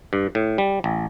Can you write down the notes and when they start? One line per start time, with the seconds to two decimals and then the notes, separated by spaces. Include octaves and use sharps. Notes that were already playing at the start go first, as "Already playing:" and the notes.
0.13 G2
0.35 A2
0.58 G3
0.84 A1